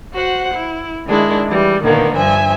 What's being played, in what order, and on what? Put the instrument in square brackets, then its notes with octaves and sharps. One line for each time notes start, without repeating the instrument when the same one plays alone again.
[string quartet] F#4 C5 F#5
E4
D#3 G#3 D4 E4
E3 G3
A#2 D3 D#3 A#3 B3
G2 F3 E5 G#5